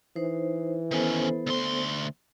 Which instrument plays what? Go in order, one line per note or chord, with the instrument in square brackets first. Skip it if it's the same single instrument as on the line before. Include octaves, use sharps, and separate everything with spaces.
[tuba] E3 [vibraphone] D#4 C5
[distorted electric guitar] D#3 C#4 [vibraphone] B3 A4 C5
[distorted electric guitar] D2 C6